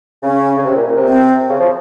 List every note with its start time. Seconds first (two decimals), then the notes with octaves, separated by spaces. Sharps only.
0.23 C#3 C#4
0.57 C#3
0.65 C3
0.75 A#2
0.86 A#2
0.97 C3
1.07 C4
1.49 C#3
1.59 F3